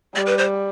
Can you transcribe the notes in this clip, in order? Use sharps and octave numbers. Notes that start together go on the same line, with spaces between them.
G3 D5
B4
C5